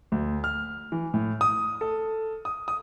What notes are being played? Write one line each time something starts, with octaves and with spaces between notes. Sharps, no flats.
D2
F6
E3
A2
D#6
A4
D#6
D#6